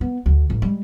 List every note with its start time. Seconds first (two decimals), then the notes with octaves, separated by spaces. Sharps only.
0.01 B3
0.26 D2
0.50 A1
0.62 G3 G#3